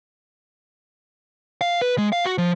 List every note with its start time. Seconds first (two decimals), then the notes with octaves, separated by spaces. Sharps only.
1.61 F5
1.82 B4
1.98 G#3
2.12 F5
2.25 F#4
2.38 F3